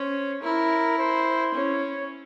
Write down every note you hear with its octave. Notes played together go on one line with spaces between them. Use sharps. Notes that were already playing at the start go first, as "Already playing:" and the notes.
Already playing: C#4 C5
E4 A#4
C5
C#4 C#5